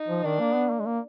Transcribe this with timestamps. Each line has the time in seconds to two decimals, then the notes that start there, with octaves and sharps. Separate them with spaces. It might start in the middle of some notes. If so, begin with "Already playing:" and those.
Already playing: D#4
0.08 F3
0.24 D#3 D4
0.39 A#3
0.55 B3
0.70 A#3
0.80 G#3
0.86 A#3